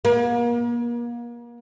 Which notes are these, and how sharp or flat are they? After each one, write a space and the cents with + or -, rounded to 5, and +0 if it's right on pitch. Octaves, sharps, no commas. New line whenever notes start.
A#3 +35